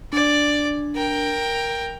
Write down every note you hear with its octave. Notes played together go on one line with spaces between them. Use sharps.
D4 D5 G#6
A#4 G5